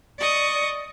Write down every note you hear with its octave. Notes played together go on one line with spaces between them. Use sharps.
D5 D#5 C#6 D#6